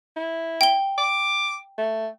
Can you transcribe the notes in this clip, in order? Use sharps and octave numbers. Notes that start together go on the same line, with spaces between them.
E4
G5 G7
D6
A3